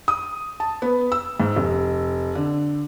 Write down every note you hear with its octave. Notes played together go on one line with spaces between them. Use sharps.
D#6
A5
B3
E6
G#2
F1
D3